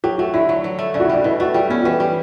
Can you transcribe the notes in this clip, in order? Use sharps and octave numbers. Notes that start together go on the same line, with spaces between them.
F#3 G4
A3 F#4
D3 E4
F#3
F#3
A3
C#3 D4
F#4
E4
G3 D4
B2 E4
A3 F#4
G3 G4
B3 C#4
F#4
E3 G4
G3